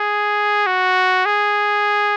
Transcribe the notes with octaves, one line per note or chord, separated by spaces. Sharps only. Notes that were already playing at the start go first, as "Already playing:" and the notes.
Already playing: G#4
F#4
G#4